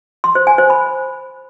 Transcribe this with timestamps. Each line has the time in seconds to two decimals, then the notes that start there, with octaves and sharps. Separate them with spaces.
0.24 C6
0.35 C5
0.47 G#5
0.58 C5
0.70 B5